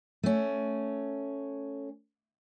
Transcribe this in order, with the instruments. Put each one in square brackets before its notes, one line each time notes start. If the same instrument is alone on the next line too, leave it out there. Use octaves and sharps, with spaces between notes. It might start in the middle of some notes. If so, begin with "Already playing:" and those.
[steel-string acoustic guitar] A3 C#4